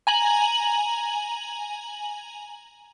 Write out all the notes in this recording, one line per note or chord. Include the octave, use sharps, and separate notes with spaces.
G#5 A#5 F#7